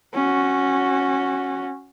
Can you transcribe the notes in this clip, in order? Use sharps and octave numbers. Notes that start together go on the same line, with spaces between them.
C#4 F#4